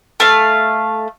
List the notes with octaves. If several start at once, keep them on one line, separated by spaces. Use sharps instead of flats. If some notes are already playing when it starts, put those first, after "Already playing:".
A3 F5